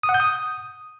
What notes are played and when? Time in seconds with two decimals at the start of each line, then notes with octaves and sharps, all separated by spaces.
0.03 D#6
0.09 F#5
0.14 G6
0.20 D#6